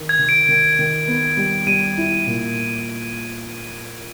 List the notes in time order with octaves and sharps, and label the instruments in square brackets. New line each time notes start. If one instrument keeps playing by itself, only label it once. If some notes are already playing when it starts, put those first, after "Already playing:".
Already playing: [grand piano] D#3
[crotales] G#6
[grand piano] D#3
[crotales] D7
[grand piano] D#3
D#3
B3
G3
[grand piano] G3 [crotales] D#7
[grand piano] E4
A#2